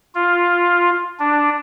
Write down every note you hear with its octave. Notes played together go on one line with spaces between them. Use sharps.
F4
D4